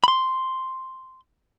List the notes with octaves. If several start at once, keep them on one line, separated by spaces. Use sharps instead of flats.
B5 C6